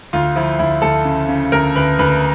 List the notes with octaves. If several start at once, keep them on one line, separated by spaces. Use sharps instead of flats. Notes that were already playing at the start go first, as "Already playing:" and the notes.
D2 F4
F3 E4
D2 E4
D2 A4
C#3
C#3
D2 A#4
D2 B4
D2 B4